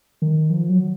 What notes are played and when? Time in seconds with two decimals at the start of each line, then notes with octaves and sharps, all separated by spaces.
0.22 D#3
0.50 F3
0.69 F#3